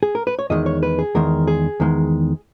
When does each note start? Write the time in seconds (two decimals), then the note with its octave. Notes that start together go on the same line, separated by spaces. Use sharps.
0.03 G#4
0.15 A#4
0.27 B4
0.39 C#5
0.50 E2 D#3 G#3 D#5
0.66 C#5
0.83 B4
0.99 G#4
1.15 E2 D#3 G#3 A#4
1.47 G#4
1.80 E2 D#3 G#3